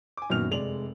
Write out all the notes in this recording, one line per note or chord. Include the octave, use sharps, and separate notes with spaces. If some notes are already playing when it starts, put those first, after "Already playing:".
G#5 D6
A#1 F#2 D#3 B3 F6 F7
F1 G#3 D5 F7 F#7